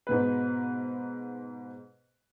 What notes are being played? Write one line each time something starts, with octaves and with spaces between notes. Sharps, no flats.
G#2 B2 B4